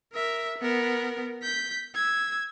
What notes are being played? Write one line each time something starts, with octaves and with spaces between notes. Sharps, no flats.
A#4 E5
B3 A#4
G6 B6
E6 G#6